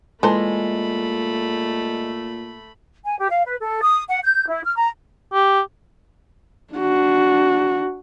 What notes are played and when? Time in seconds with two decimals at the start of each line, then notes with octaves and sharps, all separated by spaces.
0.23 A#2 E3 G#3 A3 A4 C5 B5
3.05 G#5
3.18 G4
3.31 F5
3.46 B4
3.60 A4
3.83 D#6
4.08 F#5
4.24 G6
4.47 E4
4.64 F6
4.76 A#5
5.33 G4
6.74 D4 F#4